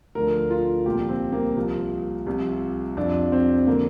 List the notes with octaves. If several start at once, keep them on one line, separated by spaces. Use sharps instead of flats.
D2 D3 F3 A#4
F4
C2 A#2 F3 G4
C4
A#3
C2 C3 F3
C2 C3 F3
F2 C3 F3 D4
C4
D3 F3 A#3